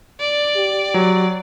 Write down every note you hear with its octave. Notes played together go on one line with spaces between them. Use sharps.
D5
G4
F#3